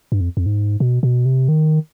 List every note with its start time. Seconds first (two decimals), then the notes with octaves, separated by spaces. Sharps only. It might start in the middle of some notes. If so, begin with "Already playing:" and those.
0.12 G2
0.21 F2
0.37 F2
0.46 G#2
0.80 B2
1.03 B2
1.25 C3
1.49 D#3